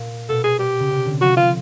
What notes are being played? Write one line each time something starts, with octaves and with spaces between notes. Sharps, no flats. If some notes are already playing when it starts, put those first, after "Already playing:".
Already playing: A#2
B2 A4
G#4
G4
C#3
C3
D3
F3 F#4
F4